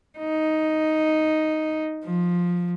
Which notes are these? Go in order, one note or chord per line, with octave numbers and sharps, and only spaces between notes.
D#4
F3